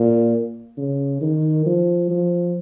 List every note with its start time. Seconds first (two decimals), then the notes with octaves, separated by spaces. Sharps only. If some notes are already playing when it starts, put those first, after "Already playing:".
Already playing: A#2
0.78 C#3
1.21 D#3
1.66 F3
2.10 F3